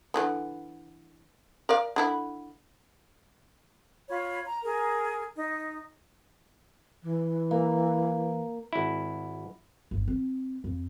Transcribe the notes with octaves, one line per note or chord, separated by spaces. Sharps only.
D3 E3 B3
A#4 D5 F5
D3 E4 B5
F4 C#5 B5
A#5
G#4 A#4
D#4
E3
A#3
G#1 E4
G1
C4
F2